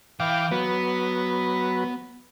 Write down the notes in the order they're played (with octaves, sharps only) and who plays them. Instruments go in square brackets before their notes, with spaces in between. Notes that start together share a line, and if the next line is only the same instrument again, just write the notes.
[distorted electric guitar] E3 E4 [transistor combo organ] F5 G5 D6
[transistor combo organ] F#3 B4 [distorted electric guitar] B3